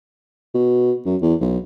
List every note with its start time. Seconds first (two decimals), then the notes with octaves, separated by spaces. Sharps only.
0.54 B2
1.05 F#2
1.22 E2
1.41 B1